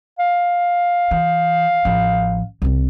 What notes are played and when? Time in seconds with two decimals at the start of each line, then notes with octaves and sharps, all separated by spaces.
0.19 F5
1.11 E3
1.85 A1 F3
2.62 C2 C4